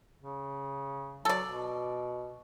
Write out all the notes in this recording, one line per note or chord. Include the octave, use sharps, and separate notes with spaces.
C#3
F#3 A4 D5
B2